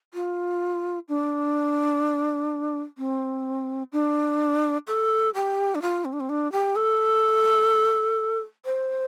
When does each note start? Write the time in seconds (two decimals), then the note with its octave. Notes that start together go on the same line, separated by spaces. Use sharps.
0.14 F4
1.08 D4
2.98 C4
3.92 D4
4.87 A4
5.34 G4
5.75 D4
5.82 F4
6.05 C4
6.13 D4
6.20 C4
6.29 D4
6.52 G4
6.76 A4
8.65 C5